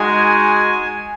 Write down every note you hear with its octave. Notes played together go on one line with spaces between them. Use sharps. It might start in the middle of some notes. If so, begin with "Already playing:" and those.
Already playing: G#3 D#4 F#4 G#5